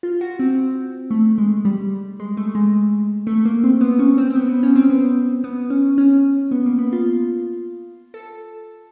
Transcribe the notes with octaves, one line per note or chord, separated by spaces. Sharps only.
F4
F#4
C4
A3
G#3
G3
G#3
A3
G#3
A3
A#3
C4
B3
C#4
C4
C4
B3
B3
C#4
C4
B3
B3
C#4
C#4
B3
A#3
B3
F4
A4